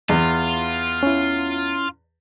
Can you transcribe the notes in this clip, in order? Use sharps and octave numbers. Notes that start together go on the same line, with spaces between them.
E2 F4
C#4 E4